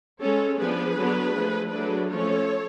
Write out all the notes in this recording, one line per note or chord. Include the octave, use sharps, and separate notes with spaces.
G#3 C#4 A4 C#5
F3 B3 D4 G#4 B4
D3 F#3 B3 D4
D3 F3 A3
F#3 A3 D4 G#4 B4
F3 A3 C#4 A4 C#5